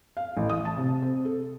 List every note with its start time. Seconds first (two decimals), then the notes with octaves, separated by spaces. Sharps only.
0.17 F5
0.37 A1
0.50 D#6
0.65 A5
0.77 C3
1.02 C4
1.25 A4